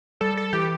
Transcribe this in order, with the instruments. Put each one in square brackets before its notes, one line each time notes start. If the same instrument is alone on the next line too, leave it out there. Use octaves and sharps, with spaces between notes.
[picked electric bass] G3 [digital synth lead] A4
[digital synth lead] A4
[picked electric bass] E3 [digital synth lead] G4